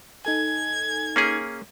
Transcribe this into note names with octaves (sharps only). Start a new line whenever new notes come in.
D#4 A4 G#5 G#6
A#3 C#4 G#4